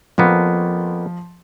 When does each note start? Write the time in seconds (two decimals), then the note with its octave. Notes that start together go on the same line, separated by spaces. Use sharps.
0.18 F2 F3 A#3 B3